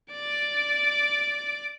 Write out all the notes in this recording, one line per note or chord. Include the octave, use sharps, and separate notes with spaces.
D5 D6